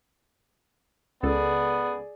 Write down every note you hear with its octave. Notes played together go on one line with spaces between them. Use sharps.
C#2 B3 G#4 A4 D5